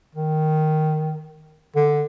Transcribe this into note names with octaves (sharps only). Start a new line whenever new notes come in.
D#3
D3